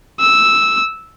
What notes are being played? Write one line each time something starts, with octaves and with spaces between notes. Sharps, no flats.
E6